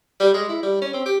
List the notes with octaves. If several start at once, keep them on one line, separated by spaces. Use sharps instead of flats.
G3
G#3
E4
G3
C#4
C4
G4